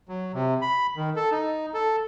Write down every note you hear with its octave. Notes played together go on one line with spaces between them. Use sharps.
F#3
C3
B5
D#3
A4
D#4
A4